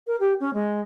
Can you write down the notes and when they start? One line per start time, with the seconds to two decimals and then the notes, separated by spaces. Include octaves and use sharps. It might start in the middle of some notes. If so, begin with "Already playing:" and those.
0.06 A#4
0.20 G4
0.40 C#4
0.53 G#3